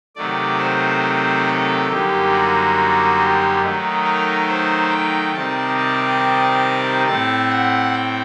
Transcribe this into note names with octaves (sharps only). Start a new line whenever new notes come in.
C3 D#3 F#3 A3 D5
C5
A4
F#2 D3 G3 A#3 D#4 G4
F#4
G4
D#3 F#3 A3 D#4
A#4
C5
G5
C3 D#3 G3 C4 D#4 A5
A5
A2 A3 C4 A5
F#5
G5